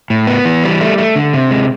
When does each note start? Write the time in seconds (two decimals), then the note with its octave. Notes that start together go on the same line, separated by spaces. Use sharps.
0.10 A2
0.27 B3
0.45 E3
0.64 G3
0.81 A3
0.98 A3
1.16 D3
1.33 C3
1.51 G#3